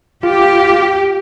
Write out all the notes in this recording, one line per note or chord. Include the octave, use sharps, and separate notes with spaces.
F4 G4